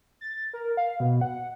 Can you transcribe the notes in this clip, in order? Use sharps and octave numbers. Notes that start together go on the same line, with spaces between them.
A6
A#4
F5
B2
F#5